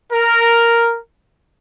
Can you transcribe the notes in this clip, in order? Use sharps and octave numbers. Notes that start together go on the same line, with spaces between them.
A#4